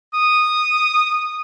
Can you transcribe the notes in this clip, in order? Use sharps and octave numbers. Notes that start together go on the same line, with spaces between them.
D#6